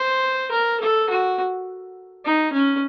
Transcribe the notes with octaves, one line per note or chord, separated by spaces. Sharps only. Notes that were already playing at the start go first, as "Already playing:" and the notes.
Already playing: C5
A#4
A4
F#4
D#4
C#4